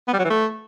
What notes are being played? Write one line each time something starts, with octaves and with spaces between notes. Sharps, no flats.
B3
G3
F#3
E3
A3